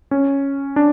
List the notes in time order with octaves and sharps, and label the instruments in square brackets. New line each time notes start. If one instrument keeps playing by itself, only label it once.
[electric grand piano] C#4
D4